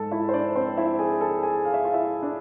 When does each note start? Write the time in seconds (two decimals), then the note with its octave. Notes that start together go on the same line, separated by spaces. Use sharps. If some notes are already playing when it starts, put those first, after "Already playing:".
Already playing: G#2 G#3 A4 A5
0.12 E4 E5
0.29 C5
0.34 D4 D5
0.56 C4 C5
0.78 E4 E5
0.99 G#4 G#5
1.21 A4 A5
1.43 G#4 G#5
1.65 F5
1.74 E5
1.84 F4 F5
1.94 E4 E5
2.23 D4 D5